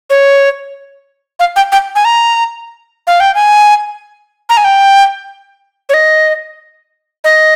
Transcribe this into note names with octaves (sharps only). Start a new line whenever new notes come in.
C#5
F5
G5
G5
G#5
A#5
F5
G5
G#5
A#5
G#5
G5
C#5
D#5
D#5